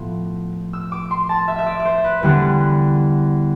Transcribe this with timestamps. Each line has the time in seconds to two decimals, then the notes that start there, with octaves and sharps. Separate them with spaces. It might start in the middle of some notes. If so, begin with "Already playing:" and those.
Already playing: A2 F3 B3
0.73 E6
0.92 D6
1.11 C6
1.29 A5
1.48 E5
1.58 E5
1.66 D5
1.80 D5
1.85 C5
2.04 B4
2.23 E2 D3 G3 B3 D4 B4